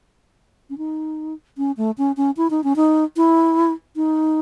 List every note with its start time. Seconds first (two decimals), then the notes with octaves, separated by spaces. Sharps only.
0.70 C#4
0.78 D#4
1.58 C#4
1.77 A3
1.98 C#4
2.17 C#4
2.37 E4
2.50 D#4
2.64 C#4
2.76 D#4
3.17 E4
3.96 D#4